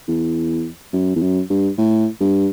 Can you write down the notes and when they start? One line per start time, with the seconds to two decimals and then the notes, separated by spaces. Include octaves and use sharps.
0.08 E2
0.93 F#2
1.15 E2
1.21 F#2
1.50 G2
1.78 A2
2.20 G2